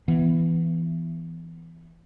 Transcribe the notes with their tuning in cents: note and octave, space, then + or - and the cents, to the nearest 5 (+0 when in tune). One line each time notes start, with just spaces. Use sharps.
E3 +10 B3 +0